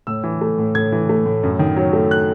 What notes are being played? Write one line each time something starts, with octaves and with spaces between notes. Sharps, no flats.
A2 E6
E3
A3
A2
A2 G#6
E3
A3
A2
F#2
D#3
F#3
A3
F#6